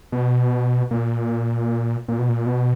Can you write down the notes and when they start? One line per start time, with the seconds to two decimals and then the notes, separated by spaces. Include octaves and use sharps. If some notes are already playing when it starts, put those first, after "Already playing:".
0.12 B2
0.91 A#2
2.08 A#2
2.19 B2
2.29 A#2
2.46 B2